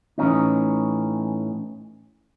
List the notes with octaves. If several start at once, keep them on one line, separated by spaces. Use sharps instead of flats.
A2 E3 C#4 D#4